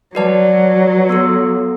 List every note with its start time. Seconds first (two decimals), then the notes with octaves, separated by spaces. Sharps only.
0.15 F#3 F#4 B4 D5 A5
1.09 B3 F#4 A4